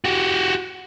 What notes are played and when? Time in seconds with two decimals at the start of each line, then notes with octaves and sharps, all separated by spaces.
0.05 F#4 G4